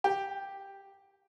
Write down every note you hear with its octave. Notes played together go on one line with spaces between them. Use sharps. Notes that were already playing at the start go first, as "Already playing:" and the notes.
G4